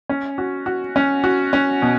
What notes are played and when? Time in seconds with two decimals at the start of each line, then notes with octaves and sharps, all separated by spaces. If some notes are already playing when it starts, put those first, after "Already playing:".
0.09 C#4
0.38 F#4
0.66 F#4
0.96 C#4
1.24 F#4
1.53 C#4
1.82 B2